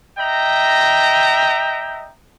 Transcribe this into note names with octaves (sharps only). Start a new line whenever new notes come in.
D#5 E5 G5 A#5